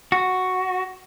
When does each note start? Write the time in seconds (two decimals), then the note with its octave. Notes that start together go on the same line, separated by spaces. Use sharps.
0.12 F#4